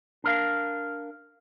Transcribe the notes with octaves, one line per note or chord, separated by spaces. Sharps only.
D4 A#4 F5